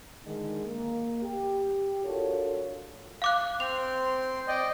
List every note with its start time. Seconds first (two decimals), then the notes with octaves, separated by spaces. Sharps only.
0.24 D3 D#3 G#3
0.65 A#3
1.22 G4
2.03 D4 F4 F#4 A4 A#4 C#5
3.22 F5 D6 F#6
3.60 C4 C6 F7
4.48 D5 D#5 G5